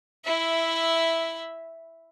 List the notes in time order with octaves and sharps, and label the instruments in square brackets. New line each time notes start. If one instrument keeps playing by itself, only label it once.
[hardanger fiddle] E4 E5